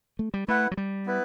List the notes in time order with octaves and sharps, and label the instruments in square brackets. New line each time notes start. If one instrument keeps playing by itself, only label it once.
[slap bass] A3
G3
[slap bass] A3 [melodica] E4 B4 F#5
[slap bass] F#3
G3
[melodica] B3 E4 B4